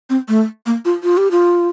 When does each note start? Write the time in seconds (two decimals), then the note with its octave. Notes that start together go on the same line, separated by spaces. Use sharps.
0.10 C4
0.28 A3
0.66 A#3
0.85 F4
1.03 F4
1.17 G4
1.31 F4